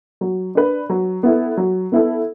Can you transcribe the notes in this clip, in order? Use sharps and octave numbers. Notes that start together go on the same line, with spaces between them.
F#3
D4 B4
F#3
B3 E4 A4
F#3
B3 E4 A4